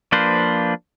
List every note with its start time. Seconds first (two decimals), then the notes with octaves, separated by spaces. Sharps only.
0.12 F3 A#3 D4 B4 C5